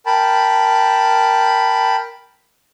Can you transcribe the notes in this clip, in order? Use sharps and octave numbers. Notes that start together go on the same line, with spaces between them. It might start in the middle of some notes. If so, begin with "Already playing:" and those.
A#4 G5 A5 B5